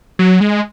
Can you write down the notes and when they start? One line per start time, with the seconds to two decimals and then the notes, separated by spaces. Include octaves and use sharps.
0.19 F#3
0.41 G#3